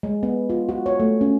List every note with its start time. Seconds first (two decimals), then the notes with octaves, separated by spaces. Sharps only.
0.03 G#3
0.23 B3
0.50 F4
0.69 F#4
0.86 C#5
1.00 A3
1.21 C#4